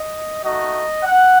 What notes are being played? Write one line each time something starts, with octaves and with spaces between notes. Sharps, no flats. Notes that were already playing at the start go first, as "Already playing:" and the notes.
Already playing: D#5
A3 D#4 F#4 D#5
F#5